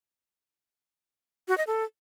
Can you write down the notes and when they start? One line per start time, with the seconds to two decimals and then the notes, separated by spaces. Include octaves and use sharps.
1.48 F#4
1.58 D#5
1.67 A4